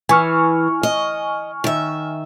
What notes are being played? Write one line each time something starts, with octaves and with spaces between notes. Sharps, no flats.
E3 G#5 C#6 F6
D#5
D#3 E5